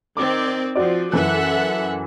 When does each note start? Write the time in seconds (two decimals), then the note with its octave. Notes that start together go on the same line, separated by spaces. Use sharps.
0.17 D#3 C4 D5 D6
0.76 F3 C4 F#4 D5
1.12 F#2 E3 A4 E5 F#5 F#6